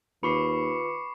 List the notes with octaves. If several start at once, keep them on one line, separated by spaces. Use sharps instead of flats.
D#2 F4 B4 B5 C#6 D6 C7 C#7